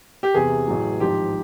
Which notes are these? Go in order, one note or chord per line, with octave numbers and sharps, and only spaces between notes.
G4
E2 C3 E3 G#4
A1 A2 F#3
G#1 G#2 F3 G4